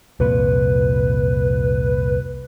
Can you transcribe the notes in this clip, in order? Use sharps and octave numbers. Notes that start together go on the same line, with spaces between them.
C2 F2 A#2 B4